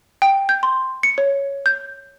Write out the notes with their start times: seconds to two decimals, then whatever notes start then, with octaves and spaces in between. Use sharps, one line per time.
0.22 G5
0.49 G6
0.63 C6
1.03 C#7
1.18 C#5
1.66 G6